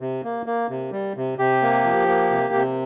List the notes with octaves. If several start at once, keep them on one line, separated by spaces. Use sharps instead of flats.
C3
A#3
A#3
C3
G3
C3
C3 G4
A#3
F3
A#3
C3
C3